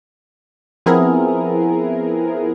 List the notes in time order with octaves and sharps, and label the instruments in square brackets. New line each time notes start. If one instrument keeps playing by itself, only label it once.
[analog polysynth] F3 B3 C4 E4 G#4 A#4